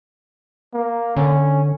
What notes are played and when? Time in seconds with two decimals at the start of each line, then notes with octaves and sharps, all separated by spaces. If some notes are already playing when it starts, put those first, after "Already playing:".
0.73 A#3
1.16 D3 C#4